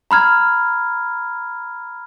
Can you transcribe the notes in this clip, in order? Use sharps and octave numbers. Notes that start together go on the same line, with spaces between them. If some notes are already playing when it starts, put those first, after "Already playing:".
A#5 B5 F6 G#6